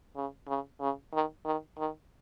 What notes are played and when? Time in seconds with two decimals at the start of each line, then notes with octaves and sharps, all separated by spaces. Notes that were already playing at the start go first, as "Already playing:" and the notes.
0.16 C#3
0.48 C#3
0.81 C#3
1.13 D#3
1.45 D#3
1.78 D#3